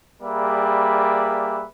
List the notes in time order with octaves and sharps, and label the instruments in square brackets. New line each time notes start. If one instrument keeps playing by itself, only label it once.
[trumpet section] G3 A#3 G#4 B4 D5 E5